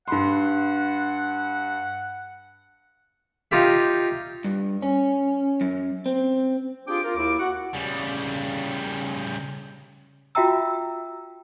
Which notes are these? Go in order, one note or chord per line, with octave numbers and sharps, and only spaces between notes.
G2 F#5 B5 C6
D#4 F4 G4 E5
G2
C#4
F#2
C4
D4 F4 G4 G#4 G5 D6
F4 A#4
D#2 E4 A#4 D6
F#4 F#5
C#3 G3
F4 F#4 E5 G5 A#5 E6